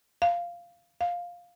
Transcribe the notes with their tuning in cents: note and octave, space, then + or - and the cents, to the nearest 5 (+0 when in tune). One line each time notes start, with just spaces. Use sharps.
F5 -5
F5 +10